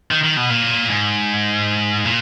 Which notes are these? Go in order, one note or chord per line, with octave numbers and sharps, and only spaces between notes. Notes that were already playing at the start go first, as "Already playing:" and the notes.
D#3
D#3
B2
A#2
G#2
A#2